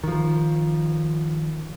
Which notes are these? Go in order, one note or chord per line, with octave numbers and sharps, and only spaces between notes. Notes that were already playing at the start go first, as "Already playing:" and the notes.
D#3 F3